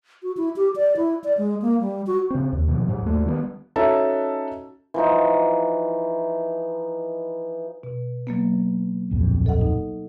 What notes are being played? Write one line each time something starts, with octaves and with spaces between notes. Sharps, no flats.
F#4
E4
G4
D5
E4
D5
G#3
A#3
G3
F#4
C#3 C4
D#2
B2 D#3 F3
G#2 F#3
D#2 A3
D#3 G3 B3
C#4 D#4 F#4 A4 E5 A5
E3 F3 D#4
B2
F#3 A#3 B3
D1 A#1 F2
A4 D#5 F#5
D#4